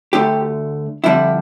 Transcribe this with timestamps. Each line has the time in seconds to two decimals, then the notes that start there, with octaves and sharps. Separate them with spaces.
0.13 D2 D3 A3 G4
1.04 F2 D3 G3 D4 E4